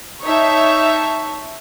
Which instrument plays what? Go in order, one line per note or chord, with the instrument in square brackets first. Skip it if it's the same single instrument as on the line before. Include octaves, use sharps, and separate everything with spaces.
[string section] D#4 C#5 E5 A5